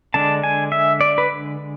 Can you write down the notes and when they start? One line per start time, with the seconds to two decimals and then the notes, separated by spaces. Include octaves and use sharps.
0.14 D3 G#3 D4 A5
0.43 G#5
0.72 E5
1.01 D5
1.18 B4